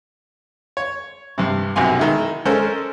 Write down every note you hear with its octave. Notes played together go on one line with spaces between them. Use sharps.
C#5
G2 C3
B1 F#2 C3 G#5 C6
D#3 G#3 E4
G#3 C#4 A4 A#4 C5